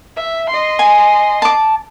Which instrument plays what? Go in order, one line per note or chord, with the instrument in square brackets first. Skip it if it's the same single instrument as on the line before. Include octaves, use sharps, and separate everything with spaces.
[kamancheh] E5
D#5 C6
[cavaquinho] G#5
A5 D6